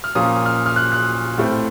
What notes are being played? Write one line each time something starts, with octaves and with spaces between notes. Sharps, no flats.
F6
A#2 F3 A#3 C#4 D#6
F6
F6
F#6
F#6
A2 A3 C4